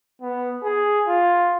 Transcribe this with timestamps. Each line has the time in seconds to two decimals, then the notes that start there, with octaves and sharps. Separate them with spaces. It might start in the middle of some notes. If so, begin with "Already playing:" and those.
0.22 B3
0.64 G#4
1.08 F4